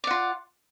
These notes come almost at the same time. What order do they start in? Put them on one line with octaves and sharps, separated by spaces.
D5 F#5 F4